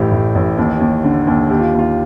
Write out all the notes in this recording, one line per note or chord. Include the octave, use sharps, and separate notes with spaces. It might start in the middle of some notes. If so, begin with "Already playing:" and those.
Already playing: A1 A2 G4
A2
A1
D#2
D#2
D3
D#2
D#2 G4
F4
D#2
F4